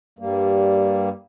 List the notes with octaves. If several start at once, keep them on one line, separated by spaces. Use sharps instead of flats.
G2 G3 A#3